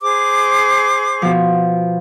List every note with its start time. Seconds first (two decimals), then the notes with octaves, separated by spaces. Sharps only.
0.02 G#4 C5 D6
1.22 B2 F3